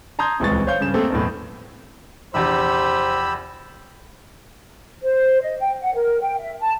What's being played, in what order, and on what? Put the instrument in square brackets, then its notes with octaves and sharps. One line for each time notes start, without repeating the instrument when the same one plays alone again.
[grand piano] A5 A#5 C6 D#6 G6 G#6
D#1 C#2 E3 C4 C#6 A6
C5 C#5 F5 G6
G2 C#3 E7
A3 A#3 C4 A4 A#4
B1 E2 A2
[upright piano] A#1 E2 C3 [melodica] G4 B5 E6 [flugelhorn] C5
[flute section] C5
D#5
G5
F#5
A#4
G5
E5
A5